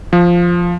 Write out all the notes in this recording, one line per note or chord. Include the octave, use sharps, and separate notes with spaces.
F3